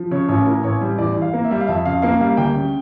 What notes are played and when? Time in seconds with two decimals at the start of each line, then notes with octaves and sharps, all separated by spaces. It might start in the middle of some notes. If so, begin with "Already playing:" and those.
Already playing: F3
0.11 C#3 C#5
0.28 A1 C#5
0.46 A2 A#4
0.63 A1 C#5
0.81 G3
0.98 E2 D5
1.16 E3
1.22 F5
1.34 A#3
1.44 E5
1.51 G3
1.61 F5
1.67 F2 E5
1.85 C#3 F5
2.02 A#3 F5
2.20 G3 F5
2.37 D2 G5
2.55 C#3